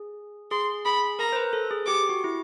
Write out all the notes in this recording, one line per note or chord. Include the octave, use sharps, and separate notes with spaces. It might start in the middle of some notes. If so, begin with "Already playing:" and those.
Already playing: G#4
G#4 C6
G#4 B5
A#4 A#5
C5
B4
A4
G#4
G4 D6
F#4
E4